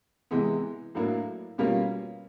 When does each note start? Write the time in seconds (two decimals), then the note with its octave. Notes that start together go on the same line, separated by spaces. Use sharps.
0.31 C3 E3 G#3 B3
0.95 A2 F#3 A#3 D4
1.58 B2 G3 A#3 C#4 F4